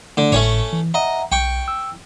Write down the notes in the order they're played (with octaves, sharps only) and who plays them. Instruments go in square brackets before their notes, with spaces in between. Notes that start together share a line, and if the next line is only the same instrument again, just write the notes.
[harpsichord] D3 [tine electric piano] A3
[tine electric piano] G#1 A2 [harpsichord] A3 C#4 C#5
[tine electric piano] E3
[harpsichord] D#5 [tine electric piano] E5 F#5 A#5
[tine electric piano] B1 [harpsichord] G5 C#6
[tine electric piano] E6